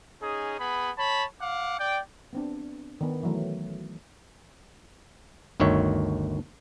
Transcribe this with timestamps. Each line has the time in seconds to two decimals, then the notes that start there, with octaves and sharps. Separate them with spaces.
0.22 C#4 D#4 G#4
0.60 B3 G#4 B5
0.98 C#5 A5 B5
1.41 F5 F#5 D6
1.79 D5 G5
2.33 B3 C4 D4
3.01 D#3 B3
3.23 E3 F#3 A3
5.60 G1 D2 D#3 C#5 E5